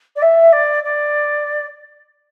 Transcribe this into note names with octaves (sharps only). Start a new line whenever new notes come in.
D5
E5
D5
D5